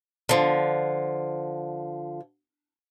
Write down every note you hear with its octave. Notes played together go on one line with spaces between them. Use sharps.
D3 F3